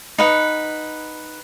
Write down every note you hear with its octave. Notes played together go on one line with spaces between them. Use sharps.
D#4 B4 F#5